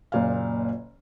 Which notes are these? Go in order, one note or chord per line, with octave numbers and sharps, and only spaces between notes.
F#1 A#2 F5